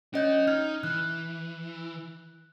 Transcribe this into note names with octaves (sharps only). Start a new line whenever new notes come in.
C#4 F#4 C#5 D#5 G6
D#4 F6 G#6
E3 F#6